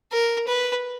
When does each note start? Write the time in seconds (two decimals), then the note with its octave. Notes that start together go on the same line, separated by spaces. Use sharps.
0.12 A#4
0.48 B4